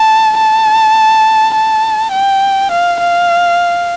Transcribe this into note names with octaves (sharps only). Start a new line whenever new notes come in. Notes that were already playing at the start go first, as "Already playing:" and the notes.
Already playing: A5
A5
A5
G5
F5
F5